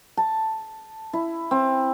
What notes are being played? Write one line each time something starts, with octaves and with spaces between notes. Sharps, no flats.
A5
E4
C4